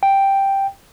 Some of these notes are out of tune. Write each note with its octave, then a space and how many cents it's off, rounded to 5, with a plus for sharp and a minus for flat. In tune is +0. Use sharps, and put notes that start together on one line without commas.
G5 +0